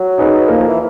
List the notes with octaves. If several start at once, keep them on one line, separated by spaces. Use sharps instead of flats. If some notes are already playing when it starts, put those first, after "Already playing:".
Already playing: F#3
D#4 G#4 B4
F3 A#3
E3